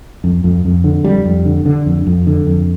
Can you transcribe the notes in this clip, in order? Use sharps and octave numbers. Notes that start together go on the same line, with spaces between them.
F2
F2
F2
D3
F2 G3
F2
D3
D3
F2
F2
D3
F2